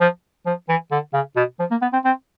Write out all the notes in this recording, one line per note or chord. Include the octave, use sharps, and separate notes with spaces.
F3
F3
E3
D3
C#3
B2
F3
A#3
B3
C4
C4